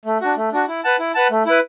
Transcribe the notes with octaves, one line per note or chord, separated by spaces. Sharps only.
A3
D4 F#4
A3
D4 F#4
E4
B4 F#5 A5
E4
B4 F#5 A5
A3
E4 B4